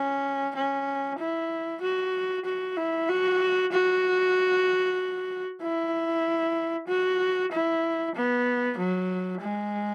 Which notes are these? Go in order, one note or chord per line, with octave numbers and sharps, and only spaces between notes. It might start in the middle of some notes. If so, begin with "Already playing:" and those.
Already playing: C#4
C#4
E4
F#4
F#4
E4
F#4
F#4
E4
F#4
E4
B3
F#3
G#3